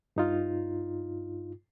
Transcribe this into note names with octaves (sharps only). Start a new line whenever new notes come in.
G2 D#4 F4